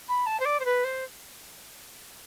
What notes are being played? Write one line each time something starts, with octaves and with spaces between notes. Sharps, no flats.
B5
A5
C5
D5
C5
B4
C5